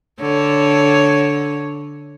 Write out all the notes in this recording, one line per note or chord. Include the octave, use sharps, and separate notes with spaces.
D3 C#5